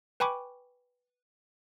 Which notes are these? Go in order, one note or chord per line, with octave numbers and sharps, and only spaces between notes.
B4 G5 G#5 B5 C#6 D6